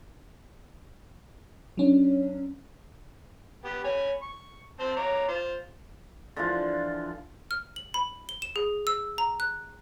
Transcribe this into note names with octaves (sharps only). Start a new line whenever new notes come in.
F#3 C#4 D4
B3 G4
C#5 G#5 B5
C#6
C4 C5 A5
C#5 A#5 D6
F4 C5
D3 E3 F3 F4
F6
F#7
B5
G7
E7
G#4
E6
A#5
F#6